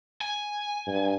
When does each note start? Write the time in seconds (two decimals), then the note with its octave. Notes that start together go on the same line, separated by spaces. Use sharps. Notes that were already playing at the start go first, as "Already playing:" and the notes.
0.21 G#5
0.87 G2